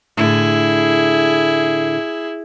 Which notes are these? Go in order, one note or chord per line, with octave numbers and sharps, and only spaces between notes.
A2 D3 E4 G#4